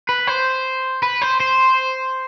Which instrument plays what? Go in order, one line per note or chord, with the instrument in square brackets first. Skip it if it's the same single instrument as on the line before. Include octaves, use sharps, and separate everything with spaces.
[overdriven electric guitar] B4
C5
B4
C5
C5